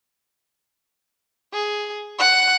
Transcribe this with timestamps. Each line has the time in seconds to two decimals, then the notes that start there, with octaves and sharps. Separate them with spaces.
1.53 G#4
2.18 F#5 F#6